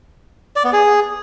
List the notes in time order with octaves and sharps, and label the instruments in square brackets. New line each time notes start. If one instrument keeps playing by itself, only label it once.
[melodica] D5
B3
G#4